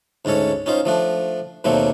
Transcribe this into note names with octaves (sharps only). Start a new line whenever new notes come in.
D2 G#2 C#4 A4 C#5
C#4 D#4 F4 C5
F3 A3 D4
D#2 B2 F#3 A3 A#3 C4